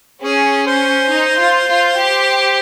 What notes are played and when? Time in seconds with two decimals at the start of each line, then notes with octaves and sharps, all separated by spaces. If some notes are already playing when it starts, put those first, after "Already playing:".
0.22 C#4 G#4
0.67 C5
1.10 D#4
1.39 F4
1.69 F4
1.97 G4